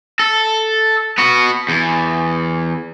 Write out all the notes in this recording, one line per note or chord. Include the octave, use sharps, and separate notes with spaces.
A4
B3 F#4
E2